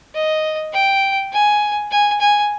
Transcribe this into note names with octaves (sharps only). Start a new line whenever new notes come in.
D#5
G5
G#5
G#5
G#5